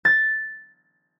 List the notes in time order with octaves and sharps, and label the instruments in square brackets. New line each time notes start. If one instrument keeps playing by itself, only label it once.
[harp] A6